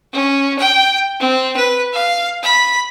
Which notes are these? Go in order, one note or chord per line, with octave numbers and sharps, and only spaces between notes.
C#4
G5
C4
B4
F5
B5